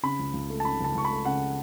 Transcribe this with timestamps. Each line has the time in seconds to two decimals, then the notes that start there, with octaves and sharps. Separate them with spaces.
0.03 C#3 B5
0.19 C#2
0.34 C#2
0.50 A3
0.60 A5
0.65 C#3 B5
0.80 C#2 A5
0.95 C#2 C#6
1.05 B5
1.10 A3
1.25 C#3 F#5